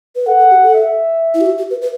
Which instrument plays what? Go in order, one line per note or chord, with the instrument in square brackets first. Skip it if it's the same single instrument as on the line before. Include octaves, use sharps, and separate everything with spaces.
[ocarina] B4
[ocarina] A4 [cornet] F#5
[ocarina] A4
G4
A4
[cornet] E5
[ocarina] E4
G4
F#4
G4
B4
B4